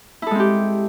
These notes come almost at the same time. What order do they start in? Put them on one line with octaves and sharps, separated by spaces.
E4 A4 G#3 C4 G4